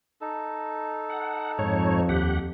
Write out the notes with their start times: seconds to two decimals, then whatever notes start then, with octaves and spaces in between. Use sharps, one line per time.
0.21 D#4 A4
1.10 F#5
1.59 F2 G#2 C#5
2.09 D#2 G4 F#5